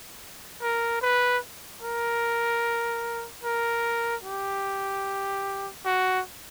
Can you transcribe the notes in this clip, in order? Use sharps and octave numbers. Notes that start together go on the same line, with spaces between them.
A#4
B4
A#4
A#4
G4
F#4